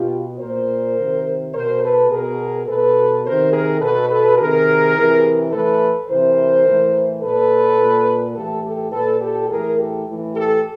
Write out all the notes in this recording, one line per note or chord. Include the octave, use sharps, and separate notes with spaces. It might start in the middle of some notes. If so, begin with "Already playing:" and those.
Already playing: B2 F4 G4
A#2 A#4 C5
C3 D#3
B2 A#4 C5
A4 B4
B2 G#4 A#4
B2 A4 B4
C3 D#3 A#4 C5
G#4 A#4
B2 A4 B4
A4 B4
C3 D#3 G#4 A#4
C3 E3
A2 E3 A4 B4
C3 E3 A#4 C5
A2 E3
A#2 A4 B4
A#2
A2 E3 G4 A4
G4 A4
A#2 A4 B4
G4 A4
A2 E3 G#4 A#4
G4 A4
A2 E3
G4 A4